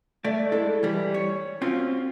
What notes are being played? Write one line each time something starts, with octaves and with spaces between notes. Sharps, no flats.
A3 D5
G#3 E4 A4
E3 G3
C#5
C4 C#4 F4 F#4